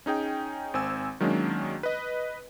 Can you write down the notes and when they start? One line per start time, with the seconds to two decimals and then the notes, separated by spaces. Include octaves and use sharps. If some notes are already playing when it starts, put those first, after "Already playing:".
0.06 C#4 D#4 G#4 G5
0.74 G#1 C4 G#5 E6
1.20 D#3 F#3 G#3 A#3 C#4 D4
1.83 B4 D#5